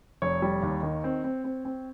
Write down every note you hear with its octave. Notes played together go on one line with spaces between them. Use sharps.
F1 C#5
G3
D#2
D#3
C4
C4
C4
C4